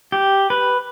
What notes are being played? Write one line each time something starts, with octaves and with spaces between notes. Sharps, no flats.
G4
B4